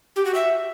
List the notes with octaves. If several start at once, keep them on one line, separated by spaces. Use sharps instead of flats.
G4
F#4
E5